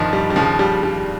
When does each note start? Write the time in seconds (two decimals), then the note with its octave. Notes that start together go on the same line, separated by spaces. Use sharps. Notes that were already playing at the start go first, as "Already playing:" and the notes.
Already playing: G1 G2 D#3 F3 D#4
0.13 G3
0.30 G3
0.36 D#2 C#3 F3
0.59 G3
0.83 G3